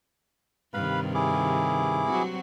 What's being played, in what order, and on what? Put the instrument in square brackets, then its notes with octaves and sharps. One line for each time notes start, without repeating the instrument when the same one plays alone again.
[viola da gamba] G2 C3 D#3 [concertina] B4 F5 B5
[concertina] E4 G#4 D6
[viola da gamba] F#3 C4 F#4